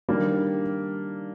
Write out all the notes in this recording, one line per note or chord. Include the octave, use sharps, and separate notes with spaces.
D#3 G3 A#3 D4